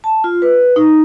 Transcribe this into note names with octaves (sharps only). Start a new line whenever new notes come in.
A5
F4
B4
D#4